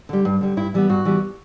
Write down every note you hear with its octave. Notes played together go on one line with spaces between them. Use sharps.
D3 G3
G2
D3 G3
G2 E4
E3 G3 B3
G2 F#4
E3 G3 B3